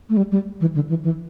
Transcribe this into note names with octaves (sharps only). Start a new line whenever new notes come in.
A3
G3
G3
E3
D3
E3
E3